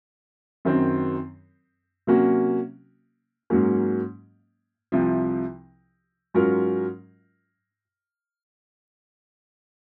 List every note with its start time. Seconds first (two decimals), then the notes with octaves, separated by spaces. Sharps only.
0.65 F#2 D#3 F#3 C4
2.07 C3 F#3 A#3 C#4 F#4
3.50 G#2 F#3 A#3 C#4
4.92 C2 C3 F3
6.34 G#2 F#3 C#4 F4 A#4